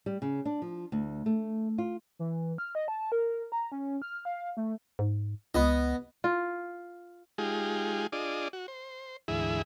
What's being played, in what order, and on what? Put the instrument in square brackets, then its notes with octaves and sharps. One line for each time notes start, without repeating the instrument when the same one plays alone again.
[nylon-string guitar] G3
C#3
D4
F3
D2
A3
F4
[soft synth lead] E3
F6
D#5
A5
A#4
A#5
C#4
F6
F5
A3
[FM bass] G#2
[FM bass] C#2 [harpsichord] B3 D#5
[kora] F4
[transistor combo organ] G#3 D#4 F4 G4 G#4
D4 F4 G#4 D5 D#5
F#4
C5
D2 G#2 E3 E4 G#4 E5